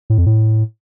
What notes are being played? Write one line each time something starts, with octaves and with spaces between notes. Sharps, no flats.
A2
F2
A2